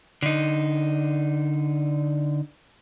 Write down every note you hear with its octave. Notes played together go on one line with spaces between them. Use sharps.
D3 D#4